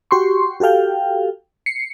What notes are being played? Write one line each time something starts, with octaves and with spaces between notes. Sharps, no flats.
F#4 G4 C6 C#6
F#4 G4 A4 F5 G5
C7 C#7